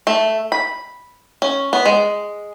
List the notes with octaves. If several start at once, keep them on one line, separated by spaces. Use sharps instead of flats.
A3
B5
C#4
B3
G#3